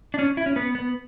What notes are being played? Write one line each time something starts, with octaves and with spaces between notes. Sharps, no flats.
D4
C#4
E4
C#4
B3
B3